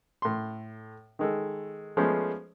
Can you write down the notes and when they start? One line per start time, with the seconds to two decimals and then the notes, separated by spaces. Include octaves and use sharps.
0.22 A2 C6
1.19 D#3 G#3 A4
1.97 F3 G#3 A3 B3 C#4 C5